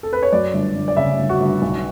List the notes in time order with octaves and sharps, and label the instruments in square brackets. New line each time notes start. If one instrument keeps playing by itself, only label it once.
[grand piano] A4
B4
C#5
F#2 D5
G1
G1
D5
C#3 E5
G1
F#4
G1
B1